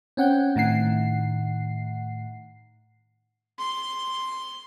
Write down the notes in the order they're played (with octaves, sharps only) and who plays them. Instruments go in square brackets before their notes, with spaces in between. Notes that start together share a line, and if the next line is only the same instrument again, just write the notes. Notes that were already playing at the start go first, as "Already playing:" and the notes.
[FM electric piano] C4 C#4 F#5 G5 G6
A2 D#3 F#5 C7
[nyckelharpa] C6